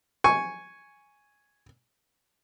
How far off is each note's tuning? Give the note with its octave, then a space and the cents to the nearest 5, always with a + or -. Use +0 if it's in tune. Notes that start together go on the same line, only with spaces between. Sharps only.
G#5 +0 C#6 +0